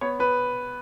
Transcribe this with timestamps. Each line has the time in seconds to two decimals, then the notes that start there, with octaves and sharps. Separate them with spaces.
0.01 B3 C#5
0.19 B3 B4